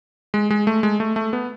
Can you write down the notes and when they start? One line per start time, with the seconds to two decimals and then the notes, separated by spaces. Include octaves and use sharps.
0.34 G#3
0.50 G#3
0.67 A3
0.83 G#3
1.00 A3
1.16 A3
1.33 B3